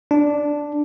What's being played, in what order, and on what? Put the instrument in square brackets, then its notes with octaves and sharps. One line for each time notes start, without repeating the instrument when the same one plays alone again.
[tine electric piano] D4